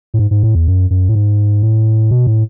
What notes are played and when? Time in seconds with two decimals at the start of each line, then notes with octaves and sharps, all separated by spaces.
0.14 A2
0.19 G#2
0.31 G#2
0.43 A2
0.55 E2
0.67 F#2
0.90 F#2
1.09 A2
1.15 G#2
1.62 A2
2.11 B2
2.27 A2